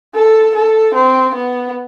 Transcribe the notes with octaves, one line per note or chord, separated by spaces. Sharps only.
A4
A4
C4
B3